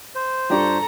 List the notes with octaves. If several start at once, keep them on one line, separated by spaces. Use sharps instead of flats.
C5
G2 F4 G4 A4 D5 A#5 C#6